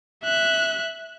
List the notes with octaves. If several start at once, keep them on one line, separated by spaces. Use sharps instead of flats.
E5 F#6